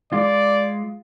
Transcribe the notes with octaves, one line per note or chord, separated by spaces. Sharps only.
G#3 F4 D5